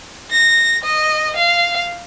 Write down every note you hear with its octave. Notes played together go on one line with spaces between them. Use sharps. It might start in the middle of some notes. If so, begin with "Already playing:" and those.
A#6
D#5
F5